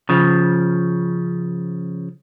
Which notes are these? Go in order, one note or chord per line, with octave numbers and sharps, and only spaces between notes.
C#3 F3